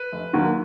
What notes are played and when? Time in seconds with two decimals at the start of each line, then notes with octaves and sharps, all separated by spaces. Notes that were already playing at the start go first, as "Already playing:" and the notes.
Already playing: B4
0.12 F1
0.33 D#2 D#3 F#3 A#3